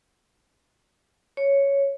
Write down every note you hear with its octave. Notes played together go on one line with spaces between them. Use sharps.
C#5